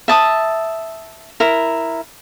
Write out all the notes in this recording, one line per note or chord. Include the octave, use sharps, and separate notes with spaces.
E5 A5 D#6
E4 A#4